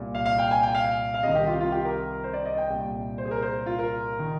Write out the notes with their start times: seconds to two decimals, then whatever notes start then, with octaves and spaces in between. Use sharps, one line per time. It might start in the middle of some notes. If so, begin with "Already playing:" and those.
Already playing: C2 A#2
0.15 F5
0.26 F5
0.38 G5
0.51 G#5
0.63 G5
0.75 F5
1.14 F5
1.23 C2 C3 D#3 D#5
1.35 G4
1.48 F4
1.61 F4
1.72 G4
1.85 A#4
2.24 C5
2.33 D5
2.45 D#5
2.57 G5
2.70 C2 A#2
3.18 C5
3.25 G#4
3.31 A#4
3.42 C5
3.66 F4
3.79 A#4
4.19 D#3